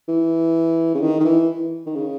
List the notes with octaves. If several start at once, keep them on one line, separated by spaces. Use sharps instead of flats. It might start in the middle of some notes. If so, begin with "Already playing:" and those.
E3
C#3
D#3
D#3
E3
D#3
C#3